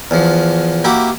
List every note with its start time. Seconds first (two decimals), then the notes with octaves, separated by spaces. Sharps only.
0.11 E2 F3
0.84 A#3 E4 F#4 G4